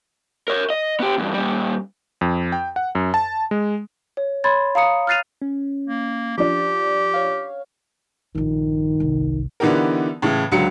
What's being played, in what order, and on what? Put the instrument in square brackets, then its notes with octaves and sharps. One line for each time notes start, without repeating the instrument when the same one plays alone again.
[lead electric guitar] A#4 C#5
D#5
B3 G4
E2 G2
A#2 G3
[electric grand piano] F2
G5
F#5
F#2
A5
G#3
[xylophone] C#5
C#5 B5 C6 G#6 A6
F5 A#5 D#6 C#7
F6 F#6 A6 C7 D#7 F7
[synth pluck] C#4
[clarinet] A#3
[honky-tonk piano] F3 D4 [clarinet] G4
[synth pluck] C#5 F5
[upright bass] A#1 G2 [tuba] D#3
[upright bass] G1 C2
[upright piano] D3 E3 B3 D#4 G4 A#4
A2 C#3 E3
C#2 D3 F#3 C#7